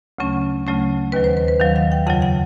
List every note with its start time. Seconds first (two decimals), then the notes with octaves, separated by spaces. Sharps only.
0.19 D2 C#3 F#3 A3 C#4
0.67 D2 C#3 F#3 A3 C#4
1.12 D#2 D#3 F#3 B4
1.24 C5
1.37 B4
1.48 B4
1.60 D#2 D#3 F#3 F5
1.76 F5
1.92 G5
2.07 F2 C#3 F#3 F#5
2.22 F#5